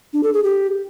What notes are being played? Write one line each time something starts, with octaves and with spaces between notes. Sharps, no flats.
D4
A4
G#4
G4